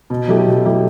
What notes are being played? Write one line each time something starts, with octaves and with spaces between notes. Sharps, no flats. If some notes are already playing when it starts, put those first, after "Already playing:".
B2
F#3 A3 E4 G4
B2
F#3 A3 E4 G4